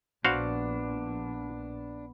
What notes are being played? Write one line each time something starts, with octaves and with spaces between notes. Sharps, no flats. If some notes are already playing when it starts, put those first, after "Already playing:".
A#1 A#2 B3 D4 F#4 C5 F5